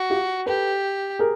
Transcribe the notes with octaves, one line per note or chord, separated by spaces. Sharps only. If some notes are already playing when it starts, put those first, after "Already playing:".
Already playing: F#4
F4 G4
G4 A4 B4
G#4 A#4